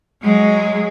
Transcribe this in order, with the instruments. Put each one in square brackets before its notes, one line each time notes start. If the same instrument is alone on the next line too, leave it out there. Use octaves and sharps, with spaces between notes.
[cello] F#3 G#3